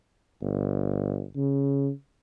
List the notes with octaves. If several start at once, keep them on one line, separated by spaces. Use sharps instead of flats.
G1
C#3